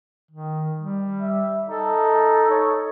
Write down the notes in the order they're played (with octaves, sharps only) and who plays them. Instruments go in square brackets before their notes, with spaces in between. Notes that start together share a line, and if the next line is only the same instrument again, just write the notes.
[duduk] D#3
G3
[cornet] E5
[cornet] D#4 [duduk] A4
[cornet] C#5